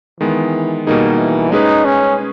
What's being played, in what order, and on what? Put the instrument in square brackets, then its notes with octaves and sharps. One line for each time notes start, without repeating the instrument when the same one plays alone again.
[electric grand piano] D#3 G#3 B3 [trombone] E3
[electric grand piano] B2 G3 A#3 D#4 G#4 [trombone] D#3
[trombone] E3
[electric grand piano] G#3 C#4 G#4 B4 [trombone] D#4
[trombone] C#4